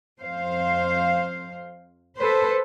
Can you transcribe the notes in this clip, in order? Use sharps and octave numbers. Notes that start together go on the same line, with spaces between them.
F2 C5 F5
A4 B4 C5